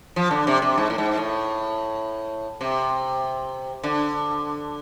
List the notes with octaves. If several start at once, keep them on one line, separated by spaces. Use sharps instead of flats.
F3
D3
C3
C3
G#2
A2
G#2
A2
C3
D3